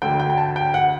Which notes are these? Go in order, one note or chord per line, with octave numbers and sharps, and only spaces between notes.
D2 D3 G5
G5
G5
A5
G5
F#5